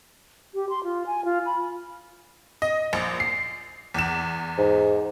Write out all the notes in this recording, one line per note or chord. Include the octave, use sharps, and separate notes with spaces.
G4
C6
F4
G#5
F4
B5
D#5
A#1
C7
E2 E7
G#2